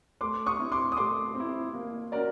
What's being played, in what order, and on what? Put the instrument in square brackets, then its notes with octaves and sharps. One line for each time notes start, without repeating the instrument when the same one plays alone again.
[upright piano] A3 [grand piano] C6 D6
[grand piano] C#6 D#6
[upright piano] C4 E4
[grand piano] C6 D6
D#6
[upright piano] A3 [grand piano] C6 D6
[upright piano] C4 E4
A#3
C#4 F#4 A#4 D5